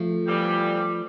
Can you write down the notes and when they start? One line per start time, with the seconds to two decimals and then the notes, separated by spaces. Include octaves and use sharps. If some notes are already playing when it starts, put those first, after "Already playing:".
Already playing: F3 A3
0.26 F2 E3 G3